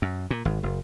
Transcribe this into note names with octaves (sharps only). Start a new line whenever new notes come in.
F#2
A#2
G#1
F#1